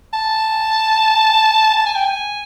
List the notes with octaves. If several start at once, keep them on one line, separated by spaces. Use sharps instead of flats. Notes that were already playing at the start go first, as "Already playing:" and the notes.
A5
A5
G#5
G5
G#5